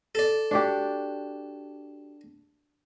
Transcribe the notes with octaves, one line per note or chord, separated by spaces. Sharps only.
A4 D5
D4 F#4 G4